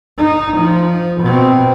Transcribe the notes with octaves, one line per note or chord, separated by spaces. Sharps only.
D#4
F3
B2 C4